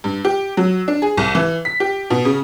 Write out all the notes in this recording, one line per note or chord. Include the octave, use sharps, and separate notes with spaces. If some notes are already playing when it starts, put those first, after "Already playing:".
G2
G4
F#3
D4
G#4
C2
E3
B6
G4
B2
C#3